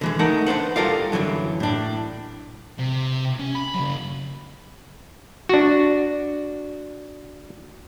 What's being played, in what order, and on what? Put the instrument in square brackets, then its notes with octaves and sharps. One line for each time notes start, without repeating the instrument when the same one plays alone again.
[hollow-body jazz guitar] D3 E3 G#3
A3 D#4 A#4 F#5
D4 B4 C5 F#5
G3 F4 A4 A#4 D5 F5
F#2 B2 D3 E3 F#3
A2 D4
[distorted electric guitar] C3
C#4
B5
F#2 C#3
[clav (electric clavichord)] D4 F#4